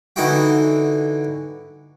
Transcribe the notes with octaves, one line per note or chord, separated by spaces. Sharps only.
D3 E3 D#4 E4 F#4 G5